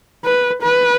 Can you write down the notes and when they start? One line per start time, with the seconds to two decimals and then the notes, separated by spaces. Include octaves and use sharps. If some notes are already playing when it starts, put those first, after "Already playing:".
0.24 B4
0.62 B4